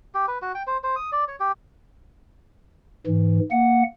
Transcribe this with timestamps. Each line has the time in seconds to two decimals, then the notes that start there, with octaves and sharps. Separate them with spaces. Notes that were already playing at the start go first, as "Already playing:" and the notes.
0.15 G4
0.28 B4
0.42 F#4
0.55 G5
0.67 C5
0.84 C5
0.96 D#6
1.12 D5
1.28 C#5
1.40 G4
3.07 G#2 E3
3.51 A#3 F#5